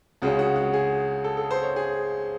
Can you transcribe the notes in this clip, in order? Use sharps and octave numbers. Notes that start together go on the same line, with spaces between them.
C#2 C#3 G#3 C#4 F#4
F#4
F#4
G#4
A4
A4
C5
C#5
G#4